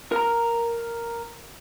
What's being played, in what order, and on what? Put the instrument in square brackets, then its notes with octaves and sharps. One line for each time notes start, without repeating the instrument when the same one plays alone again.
[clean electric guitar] A#4 A#5